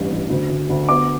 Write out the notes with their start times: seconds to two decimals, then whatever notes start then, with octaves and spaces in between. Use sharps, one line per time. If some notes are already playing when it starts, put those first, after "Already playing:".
Already playing: A1 G2
0.11 A1
0.30 D2
0.50 D2
0.70 D2
0.89 B3 D6